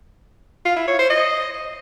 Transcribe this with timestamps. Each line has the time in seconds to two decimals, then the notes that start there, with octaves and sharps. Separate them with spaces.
0.65 F4
0.76 E4
0.88 C#5
0.99 C5
1.10 D#5